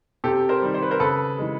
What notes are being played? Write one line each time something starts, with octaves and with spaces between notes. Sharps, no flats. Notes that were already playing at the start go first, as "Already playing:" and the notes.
C3 G4 A4
A#4 C5
D#3 G3
C5
B4
A#4 C5
C#3 A4 B4
E3 G#3